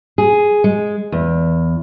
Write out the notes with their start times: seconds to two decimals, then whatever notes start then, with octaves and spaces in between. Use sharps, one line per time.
0.18 G#4
0.64 G#3
1.12 E2